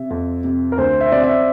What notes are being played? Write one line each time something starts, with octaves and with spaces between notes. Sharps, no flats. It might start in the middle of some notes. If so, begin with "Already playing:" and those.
Already playing: C3 E5
F2
C3
A#4
D2 C5
E5
C3 D5
E5